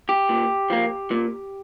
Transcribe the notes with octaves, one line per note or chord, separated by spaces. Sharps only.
G4
A#2
F3 A#3
A#2